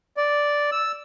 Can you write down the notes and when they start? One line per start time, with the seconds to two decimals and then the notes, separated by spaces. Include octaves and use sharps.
0.17 D5
0.72 E6